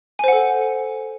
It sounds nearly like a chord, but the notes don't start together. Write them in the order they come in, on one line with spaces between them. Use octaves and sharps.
G#5 C5 F#5 A4